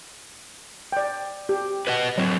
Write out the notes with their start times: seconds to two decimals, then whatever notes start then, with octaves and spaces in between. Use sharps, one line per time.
0.92 D5 G5
1.49 G4
1.87 B4 D#5 F#5
2.18 F#3 C4 C#5